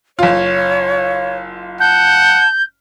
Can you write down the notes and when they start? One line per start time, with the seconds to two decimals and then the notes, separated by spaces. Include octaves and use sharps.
0.19 F#1 F4 C#5
1.80 F#5 A5 G6